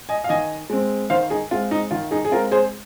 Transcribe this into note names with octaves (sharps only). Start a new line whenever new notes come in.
D#5 G#5
F5
D#3 D#5 G#5
G#3 C4
D#3 C5 F5
D#4 G#4
G#3 C4 F4
D#4
D#3 F4
D#4 G#4
G#4
G#3 C4 F4 A#4
G#4 C5